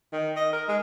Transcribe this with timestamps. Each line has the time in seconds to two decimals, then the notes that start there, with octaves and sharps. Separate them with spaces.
0.13 D#3
0.36 D#5
0.53 A#4
0.68 G#3